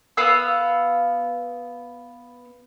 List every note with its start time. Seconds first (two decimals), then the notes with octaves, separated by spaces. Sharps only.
0.17 B3 F5 F#5 E6